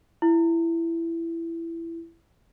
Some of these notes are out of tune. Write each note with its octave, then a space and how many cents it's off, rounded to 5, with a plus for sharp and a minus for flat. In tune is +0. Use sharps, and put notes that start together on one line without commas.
E4 +15